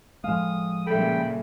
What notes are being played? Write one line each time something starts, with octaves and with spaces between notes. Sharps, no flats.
A2 F3 G#3 F5 D#6 E7
A#2 C#3 G3 A4 E5 G5 B5